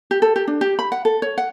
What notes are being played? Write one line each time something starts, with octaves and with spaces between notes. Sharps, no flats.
G4
A4
G4
D4
G4
B5
F#5
A4
C#5
F#5